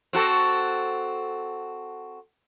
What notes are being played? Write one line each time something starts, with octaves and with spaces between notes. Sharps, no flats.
C4 F#4 A4